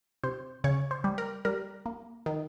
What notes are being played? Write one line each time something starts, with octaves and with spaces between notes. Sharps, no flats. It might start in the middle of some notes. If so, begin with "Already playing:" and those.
C3 C5
C#3 C#5
C5
G3
A#4
G3 A#4
A#3
D#3